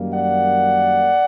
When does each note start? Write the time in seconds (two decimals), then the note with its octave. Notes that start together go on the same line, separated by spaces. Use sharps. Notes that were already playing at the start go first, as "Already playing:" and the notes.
Already playing: F#2 D#3 G3 A#3
0.12 D5 F#5